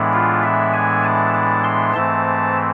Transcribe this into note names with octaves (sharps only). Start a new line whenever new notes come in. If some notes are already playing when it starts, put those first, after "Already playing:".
Already playing: A2 E3 G#3 B3 D4
F4
E5
G#5
A5
A5
C6
G#2 E3 A3 C4 A5